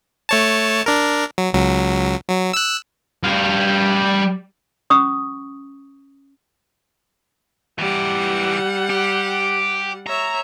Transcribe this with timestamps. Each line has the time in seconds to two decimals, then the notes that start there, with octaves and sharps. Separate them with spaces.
0.29 A3 C#5 A5
0.86 D4 A#4
1.38 F#3
1.53 C#2 F#3
2.29 F#3
2.53 E6 F#6
3.24 G3 F5
4.90 C#4 C#6 D#6
7.79 E3 G3 G4 F#5
8.90 G4
10.07 C#5 E5 A#5